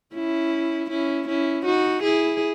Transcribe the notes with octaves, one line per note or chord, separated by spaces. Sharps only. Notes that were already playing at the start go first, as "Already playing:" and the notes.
C#4 E4
C#4 E4
C#4 E4
D#4 F#4
E4 G#4